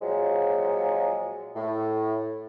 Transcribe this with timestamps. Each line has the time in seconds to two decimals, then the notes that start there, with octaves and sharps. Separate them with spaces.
0.02 A#2 F3 F#3 G#3
1.56 A2